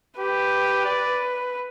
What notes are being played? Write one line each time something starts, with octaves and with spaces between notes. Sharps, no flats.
G4 B4
D5